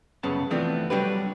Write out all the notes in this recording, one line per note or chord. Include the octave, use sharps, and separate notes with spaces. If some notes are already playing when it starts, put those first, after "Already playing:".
C2 F#2 C#3 B3 A5
E3 F3 A3 B3 C4 D4
F#3 G3 D4 G4 B4